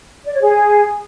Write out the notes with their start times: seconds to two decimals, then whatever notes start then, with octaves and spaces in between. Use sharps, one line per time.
0.24 D5
0.32 C#5
0.41 G#4